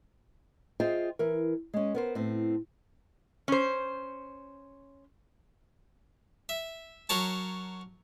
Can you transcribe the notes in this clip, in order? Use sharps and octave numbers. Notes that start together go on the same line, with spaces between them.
F4 G#4 C5 D#5 E5 G5
E3 A#4
G#3 C#4
B3 A#4 C5
A2 C4
C#4 C5
E5
F#3 A#4 C#5 A5